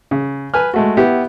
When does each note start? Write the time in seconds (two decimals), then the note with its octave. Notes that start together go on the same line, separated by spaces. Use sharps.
0.11 C#3
0.54 B4 G#5 F6
0.74 G#3 A3 F#4
0.97 B3 E4 G4